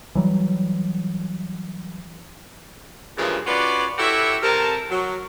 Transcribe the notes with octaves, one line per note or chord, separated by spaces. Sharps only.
E3 F#3 G3
G2 A#2 C#3 E3 F3 G#3
C#4 F4 F#4 B4 D5
E4 F#4 G4 A4 C#5 E5
C3 A#4 A5
F#3